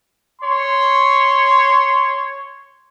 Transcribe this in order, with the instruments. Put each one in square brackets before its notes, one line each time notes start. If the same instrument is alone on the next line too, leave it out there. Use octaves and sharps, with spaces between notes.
[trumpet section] C#5 C6